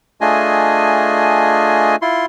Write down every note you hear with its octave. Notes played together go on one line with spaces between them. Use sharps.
A3 D4 F4 G#4 D#5 G#5
E4 F4 C6